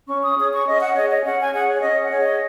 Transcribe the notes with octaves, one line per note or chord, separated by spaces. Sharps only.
C#4 C#6
D#6
G#4 C#5 D#6
C#6
C#4 D#5
F#5
G#4 C#5 D#5
D#5
C#4 F#5
G#5
G#4 C#5 F#5
C#5
C#4 D#5
F#5
G#4 C#5
D#5